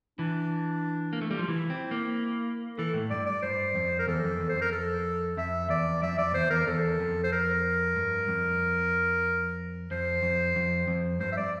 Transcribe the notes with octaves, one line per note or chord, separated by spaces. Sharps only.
E3 D4
A#3
A3
G3
F3
E3 E4
C4
A#3
E3 A4
A2
G2 D5
D5
G2 C5
F2
A#4
E2 A4
F2
E2
C5
F2
A#4
A4
F2 E5
E2 D5
F2 E5
F2 D5
E2 C5
E2 A#4
E2 A4
F2
C5
A#4
G2
F2
F2 C5
F2
F2
F2
G2 C5
E5
D5